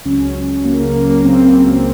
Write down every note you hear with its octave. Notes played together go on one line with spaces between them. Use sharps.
C#2 C#3 F#3 C#4
C#2 C#3 F#3 A#3
A#3
A#3
A#3
C#3 F#3 C4